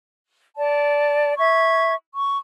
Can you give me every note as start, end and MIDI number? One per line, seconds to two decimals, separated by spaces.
0.56 1.33 74
0.56 1.33 81
1.37 1.93 76
1.37 1.93 85
1.37 1.93 92
2.13 2.38 85